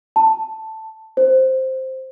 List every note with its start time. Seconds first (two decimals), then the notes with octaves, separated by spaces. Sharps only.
0.16 A5
1.17 C5